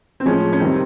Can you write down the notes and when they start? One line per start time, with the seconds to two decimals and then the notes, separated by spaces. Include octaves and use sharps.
0.20 C4
0.25 A2 F3 G#3 C#4
0.53 C#4
0.59 C3 D#3 G3 C4